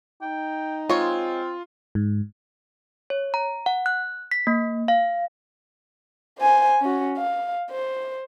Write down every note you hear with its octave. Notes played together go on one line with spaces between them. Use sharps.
D#4 G5
G#3 C4 F4 C#5 D#5
G#2
C#5
A#5
F#5
F#6
B6
A#3
F5
C5 G#5
C#4 F#4
F5
C5